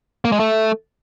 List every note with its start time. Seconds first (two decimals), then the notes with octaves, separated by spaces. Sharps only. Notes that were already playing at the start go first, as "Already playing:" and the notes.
0.25 A#3
0.32 G#3
0.40 A3